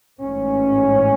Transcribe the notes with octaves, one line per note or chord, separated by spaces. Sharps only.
A1 G#2 C#4